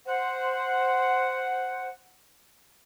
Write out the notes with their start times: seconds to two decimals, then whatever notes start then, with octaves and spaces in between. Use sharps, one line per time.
0.06 C5 F#5